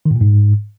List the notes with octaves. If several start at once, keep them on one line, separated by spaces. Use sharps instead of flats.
D#3
A2
A#2
G#2